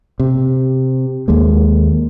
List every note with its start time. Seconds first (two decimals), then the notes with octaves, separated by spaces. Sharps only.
0.20 C3
1.28 D#2 G#3 A#3